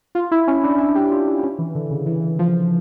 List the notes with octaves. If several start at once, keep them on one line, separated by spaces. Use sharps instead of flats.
F4
E4
C#4
D4
E4
G4
F4
D4
C#4
E3
D3
C#3
E3
F3